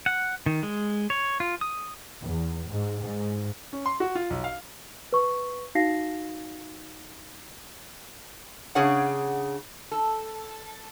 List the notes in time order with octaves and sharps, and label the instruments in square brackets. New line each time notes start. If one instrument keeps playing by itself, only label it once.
[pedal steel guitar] F#5
D#3
G#3
C#5
F4
D#6
[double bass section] E2
G#2
G#2
[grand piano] C#4
C6
F#4
F4
B1
F5
[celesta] B4 C#6
D#4 F#4 F5 A#6 C7
[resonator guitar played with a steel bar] C#3 D4 G#4 C#5 F#5
A4